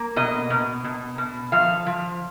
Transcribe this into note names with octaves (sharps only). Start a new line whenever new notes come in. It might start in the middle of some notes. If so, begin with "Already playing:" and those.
Already playing: A#3
B2 D#5
B2
B2
B2
F3 F5
F3